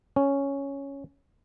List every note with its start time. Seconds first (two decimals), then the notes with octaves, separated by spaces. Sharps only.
0.16 C#4